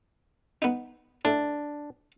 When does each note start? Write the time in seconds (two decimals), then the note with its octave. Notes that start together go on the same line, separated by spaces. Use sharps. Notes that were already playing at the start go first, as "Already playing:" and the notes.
0.62 B3 D#4
1.25 A2 D4